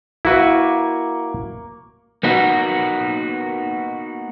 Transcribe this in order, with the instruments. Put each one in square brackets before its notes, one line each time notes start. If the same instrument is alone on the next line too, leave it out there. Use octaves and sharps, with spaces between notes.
[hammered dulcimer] A#3 C#6 [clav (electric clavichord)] E4 F#4 B4
[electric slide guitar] A#3 B3 D#4 F#4